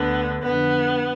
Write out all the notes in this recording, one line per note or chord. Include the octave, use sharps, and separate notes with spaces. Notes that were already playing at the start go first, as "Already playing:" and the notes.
Already playing: D2 D3 B3
F2 D3 B3